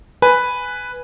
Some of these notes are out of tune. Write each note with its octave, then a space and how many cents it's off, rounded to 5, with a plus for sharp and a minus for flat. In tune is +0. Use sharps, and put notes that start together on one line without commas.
B4 +0 G#5 +0